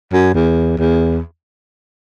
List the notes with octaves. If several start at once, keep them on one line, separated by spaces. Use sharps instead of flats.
F#2
E2
E2